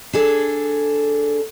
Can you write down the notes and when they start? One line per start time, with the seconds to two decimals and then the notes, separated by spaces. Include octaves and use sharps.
0.13 D4 G#4 A4